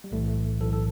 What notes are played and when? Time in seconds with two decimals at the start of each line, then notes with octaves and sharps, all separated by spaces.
0.04 G3
0.11 B1 A2 E3 A3
0.28 A3
0.61 B1 A2 E3 A4
0.73 A4